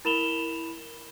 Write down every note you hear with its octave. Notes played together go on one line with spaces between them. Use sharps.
E4 A#4 B5 E7 F7 G7